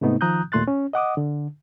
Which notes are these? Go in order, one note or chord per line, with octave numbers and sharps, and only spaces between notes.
G#2 C3 A3 B3 D#4
D#3 F3 A#5 D#6 F#6 G6
D#2 A#2 A3 C6 F#6 A6
C#4
D#5 F#5 D6 D#6
D3